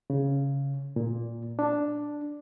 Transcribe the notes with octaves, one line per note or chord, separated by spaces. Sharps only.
C#3
A#2
D4